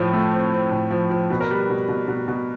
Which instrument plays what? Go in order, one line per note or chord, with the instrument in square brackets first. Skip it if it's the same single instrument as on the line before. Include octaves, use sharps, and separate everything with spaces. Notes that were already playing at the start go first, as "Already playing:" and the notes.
Already playing: [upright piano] A2 F3 C#5
A3
C4
C4
A2
F3
F3
B2 B4
A#4
G3 B4
B2
B2
B2
B2